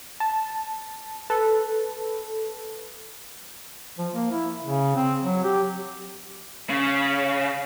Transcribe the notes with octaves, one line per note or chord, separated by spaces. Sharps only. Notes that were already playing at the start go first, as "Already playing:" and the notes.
A5
A4 B4
F3
A#3
E4
C#3
C4
F#3
G4
C#3